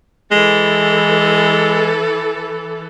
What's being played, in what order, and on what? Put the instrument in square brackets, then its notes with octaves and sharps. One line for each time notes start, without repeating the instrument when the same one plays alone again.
[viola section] E3 A4 [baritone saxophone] G#3